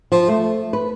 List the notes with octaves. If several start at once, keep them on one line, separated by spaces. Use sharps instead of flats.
F3
A3
B4